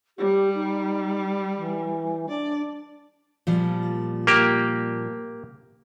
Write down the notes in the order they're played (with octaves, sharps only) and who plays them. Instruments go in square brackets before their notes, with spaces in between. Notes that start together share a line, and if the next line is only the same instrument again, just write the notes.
[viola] G3 [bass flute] G4
[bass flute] D#4
E3
[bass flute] D4 [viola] D5
[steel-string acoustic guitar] A#2 F3 G3
[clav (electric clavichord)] A#3 G4